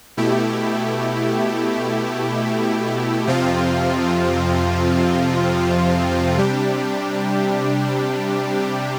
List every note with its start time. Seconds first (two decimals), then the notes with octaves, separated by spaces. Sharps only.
0.17 B2 A3 E4 G4
3.27 F2 C3 F3 C4 F4
6.36 C3 G3 D4 G4